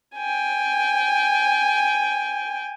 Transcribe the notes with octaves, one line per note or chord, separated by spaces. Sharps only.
G5 G#5